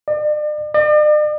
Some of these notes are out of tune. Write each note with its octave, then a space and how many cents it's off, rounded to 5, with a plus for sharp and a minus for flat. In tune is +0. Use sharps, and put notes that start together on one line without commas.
D5 +40
D5 +45